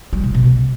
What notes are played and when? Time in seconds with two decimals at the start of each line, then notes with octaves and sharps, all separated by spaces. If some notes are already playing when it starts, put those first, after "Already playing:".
0.13 G3
0.24 B2
0.35 B2